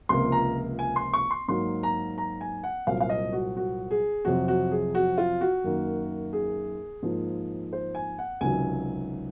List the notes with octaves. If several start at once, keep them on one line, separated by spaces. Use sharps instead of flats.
C#2 C3 F3 A#3 C6
A#5
G#5
C6
C#6
C6
G#2 F#3 A#3 C6
A#5
A#5
G#5
F#5
C2 A#2 F#3 C4 F5
F5
D#5
F#4
F#4
G#4
F2 C3 F#3 C4 F#4
F#4
G#4
F#4
F4
F#4
F#2 D#3 A#3
G#4
G#2 F3 A#3
C5
G#5
F#5
C#2 C3 D#3 F#3 G#5